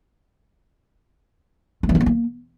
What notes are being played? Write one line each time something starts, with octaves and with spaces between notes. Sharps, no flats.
A3
E3
D#4
B3
A#3